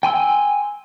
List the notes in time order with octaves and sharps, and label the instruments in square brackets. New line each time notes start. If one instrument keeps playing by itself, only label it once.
[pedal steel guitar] G5 G#5 C6 E6